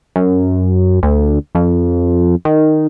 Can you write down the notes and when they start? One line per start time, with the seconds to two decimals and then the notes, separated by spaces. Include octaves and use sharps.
0.16 F#2
1.03 D2
1.55 F2
2.45 D#3